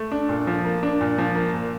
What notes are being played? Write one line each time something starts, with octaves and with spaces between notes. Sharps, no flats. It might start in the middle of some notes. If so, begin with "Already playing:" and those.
Already playing: A3
D4
A#2
F3
A#3
D4
A#2
F3
A#3
A#2